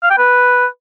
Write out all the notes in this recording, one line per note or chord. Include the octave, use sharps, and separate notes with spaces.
F5
G5
B4